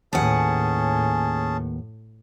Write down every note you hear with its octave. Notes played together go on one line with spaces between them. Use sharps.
D#2 A2 C#4 G#4 B4 F#5 A5